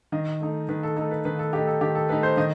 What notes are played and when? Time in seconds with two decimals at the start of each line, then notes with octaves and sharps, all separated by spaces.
0.12 D#3 D#5
0.41 A3 D#4
0.69 D#3 B4
0.83 A4
0.96 A3 D#4 A4
1.11 B4
1.25 D#3 B4
1.39 A4
1.53 A3 D#4 G4
1.67 A4
1.81 D#3 G4
1.95 A4
2.09 A3 D#4 B4
2.23 C5
2.37 D#3 D#5